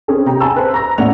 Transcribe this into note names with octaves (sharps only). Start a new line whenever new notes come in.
C4 C#4 G#4 A4
C3 G5 A#5
G#5 A5 E6
B4 C5
A#5 E6 A#6
A2 C#4 D5 F#5 F7